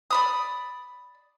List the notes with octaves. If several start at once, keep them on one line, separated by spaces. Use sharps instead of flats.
D5 B5 D#6